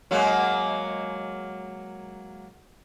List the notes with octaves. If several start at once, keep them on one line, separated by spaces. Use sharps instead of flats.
F#3 G#3 A#3